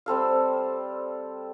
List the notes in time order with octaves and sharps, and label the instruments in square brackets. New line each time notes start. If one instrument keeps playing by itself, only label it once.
[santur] G3 C4 A4 F5